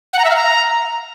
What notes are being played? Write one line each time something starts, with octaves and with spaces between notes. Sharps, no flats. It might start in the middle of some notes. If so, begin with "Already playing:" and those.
F#5
A#5
E5
F5
A#5